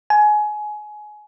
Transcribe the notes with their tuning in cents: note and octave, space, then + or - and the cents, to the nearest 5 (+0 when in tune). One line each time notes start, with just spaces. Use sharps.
G#5 +20